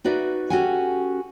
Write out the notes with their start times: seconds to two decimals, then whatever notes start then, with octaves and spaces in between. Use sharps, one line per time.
0.04 D#4 F#4 B4 D5 E5
0.50 C#4 F#4 G4 A4 F#5 G#5